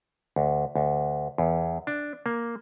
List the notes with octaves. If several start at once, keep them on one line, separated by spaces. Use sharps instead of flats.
D2
D2
E2
D4
A#3